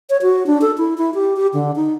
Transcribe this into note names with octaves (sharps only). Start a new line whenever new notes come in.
C#5
F#4
D4
A4
E4
E4
G4
G4
D3
D#4